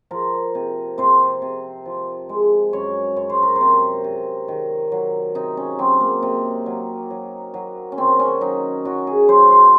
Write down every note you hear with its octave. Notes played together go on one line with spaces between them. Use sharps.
F3 A#4
C3
C3 C5
C3
F3
G#3
F#2 C#5
F#2 C#5
C5
A#4
C5
C3
C3
D#3
F#3
C3 D#4
C#4
F#3 C4
A#3
C3
F#3
F#3
F#3
C#4
D#3 C4
C#4
F#3 D#4
F#3 F#4
G#4
F#3 C5
C5